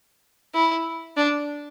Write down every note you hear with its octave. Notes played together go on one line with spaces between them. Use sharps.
E4
D4